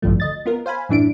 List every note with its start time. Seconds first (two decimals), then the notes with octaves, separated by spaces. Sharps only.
0.02 A1 D2 G2 F3 A3
0.20 D2 D#5 A6
0.46 B3 F4 A#4
0.66 C5 F5 G#5 B5
0.89 F#2 A2 E3 D4 E4 D7